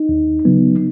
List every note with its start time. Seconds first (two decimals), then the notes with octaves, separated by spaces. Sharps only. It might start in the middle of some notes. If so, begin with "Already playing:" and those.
Already playing: D#4
0.09 D#2
0.45 C#3 F#3 B3